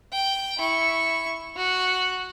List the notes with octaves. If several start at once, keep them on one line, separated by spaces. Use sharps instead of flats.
G5
E4 C#6
F#4